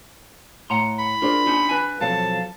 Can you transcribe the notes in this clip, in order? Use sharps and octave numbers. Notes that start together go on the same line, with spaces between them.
A2 F#5 A#5 C6
B5
D4 F4 G#4 A#4 C5
C#4 D#4 F4
B4 G#5
B1 F3 F#3 C4 A4 F5 A5